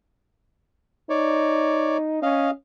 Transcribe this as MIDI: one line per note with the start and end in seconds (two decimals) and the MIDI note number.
1.10 2.22 63
1.10 1.97 73
1.10 1.97 74
2.22 2.51 61
2.22 2.51 75
2.22 2.51 77